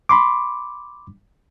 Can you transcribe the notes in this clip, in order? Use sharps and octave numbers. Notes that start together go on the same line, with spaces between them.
B5 C6 D6